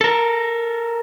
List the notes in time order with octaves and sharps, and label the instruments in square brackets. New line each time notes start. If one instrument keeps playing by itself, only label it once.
[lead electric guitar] A4 A#4